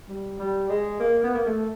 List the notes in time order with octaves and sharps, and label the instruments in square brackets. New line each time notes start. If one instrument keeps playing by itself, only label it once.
[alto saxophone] G3
G3
G#3
A#3
B3
A#3
A3